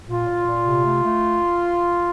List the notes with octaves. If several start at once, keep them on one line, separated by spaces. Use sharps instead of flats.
A#2 F4
A#2
A#2
C3
A3
A3